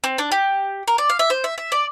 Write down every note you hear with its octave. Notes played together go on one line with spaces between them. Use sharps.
C4
D4
G4
A#4
D5
F5
E5
C5
E5
E5
D5